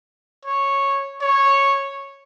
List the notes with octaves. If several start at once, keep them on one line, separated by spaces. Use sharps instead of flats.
C#5
C#5